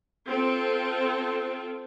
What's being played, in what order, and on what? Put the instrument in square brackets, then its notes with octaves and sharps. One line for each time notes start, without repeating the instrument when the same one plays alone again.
[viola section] C4 F4 A4